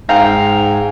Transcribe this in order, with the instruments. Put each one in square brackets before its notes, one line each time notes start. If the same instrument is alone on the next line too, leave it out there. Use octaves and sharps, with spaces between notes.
[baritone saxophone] G#2 [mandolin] F5 G5 A#5